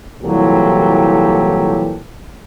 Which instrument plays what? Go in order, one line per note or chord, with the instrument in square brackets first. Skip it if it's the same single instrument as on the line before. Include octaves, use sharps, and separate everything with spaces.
[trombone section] C2 A#2 E3 F#3 G4 A4